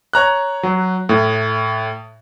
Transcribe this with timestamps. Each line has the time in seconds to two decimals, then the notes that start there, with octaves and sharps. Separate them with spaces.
0.13 C#5 A#5 F#6
0.63 F#3
1.09 A2